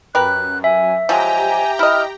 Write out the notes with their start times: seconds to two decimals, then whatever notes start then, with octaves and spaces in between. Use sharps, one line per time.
0.15 F#2 G4 A#4 B4 F#6
0.64 E5 G#5
1.09 F3 F#3 G#3 G4 G5 G#5 A#5
1.79 E4 D#5 F6